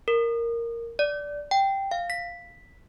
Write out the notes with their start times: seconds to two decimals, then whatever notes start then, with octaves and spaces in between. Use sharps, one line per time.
0.08 A#4
0.99 D5
1.51 G5
1.91 F5
2.10 B6